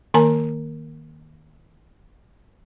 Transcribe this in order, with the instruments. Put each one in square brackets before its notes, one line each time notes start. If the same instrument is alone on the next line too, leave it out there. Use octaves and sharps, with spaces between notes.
[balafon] D#3 A#3 A#4 G#5 A#5